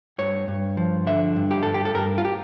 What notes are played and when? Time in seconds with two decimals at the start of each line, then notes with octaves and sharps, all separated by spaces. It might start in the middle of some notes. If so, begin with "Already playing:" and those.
0.18 G2 C#5
0.48 G2
0.77 F3
1.07 D3 E5
1.36 G2
1.51 G4
1.63 G2 A4
1.74 G4
1.85 A4
1.95 G2 A#4
2.18 F4
2.25 G4